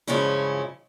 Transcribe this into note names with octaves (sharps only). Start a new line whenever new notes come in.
G2 C#3 F3 G#3 C#4 E4